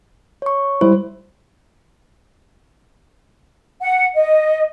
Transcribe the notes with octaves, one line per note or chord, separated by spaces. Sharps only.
C#5 C#6
G3 E4 C5
F#5
D#5